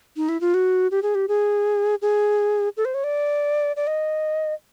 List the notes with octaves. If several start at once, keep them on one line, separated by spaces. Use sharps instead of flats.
D#4
E4
F4
F#4
G4
G#4
G4
G#4
G#4
A4
C5
C#5
D5
D5
D#5